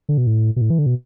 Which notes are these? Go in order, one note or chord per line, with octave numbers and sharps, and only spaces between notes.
D3
B2
A2
B2
A2
E3
D3
B2